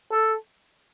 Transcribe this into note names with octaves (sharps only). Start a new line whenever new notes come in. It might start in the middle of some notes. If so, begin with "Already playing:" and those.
A4